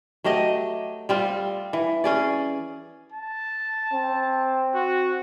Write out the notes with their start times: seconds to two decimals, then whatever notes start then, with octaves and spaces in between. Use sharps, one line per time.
0.24 F#3 A3 G4 D#5
1.09 G3 C4 F4
1.73 E3
2.04 C#4 G#4 D5
3.13 A5
3.93 C4
4.75 F#4